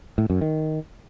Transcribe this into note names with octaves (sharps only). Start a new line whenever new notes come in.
A2
F#2
D#3